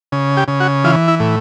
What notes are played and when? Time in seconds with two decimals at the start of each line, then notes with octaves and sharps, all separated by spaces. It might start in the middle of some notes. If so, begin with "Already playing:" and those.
0.12 C#3
0.37 G4
0.48 C#3
0.60 F#4
0.84 E3 F4
1.08 E4
1.20 A2